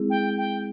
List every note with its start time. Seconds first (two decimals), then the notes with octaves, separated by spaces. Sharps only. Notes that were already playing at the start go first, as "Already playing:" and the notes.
Already playing: G#3 C4 E4 G#4
0.10 G5
0.38 G5